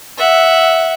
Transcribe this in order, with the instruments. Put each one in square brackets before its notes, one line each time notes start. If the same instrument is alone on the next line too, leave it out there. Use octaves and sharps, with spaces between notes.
[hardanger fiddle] E5 F#5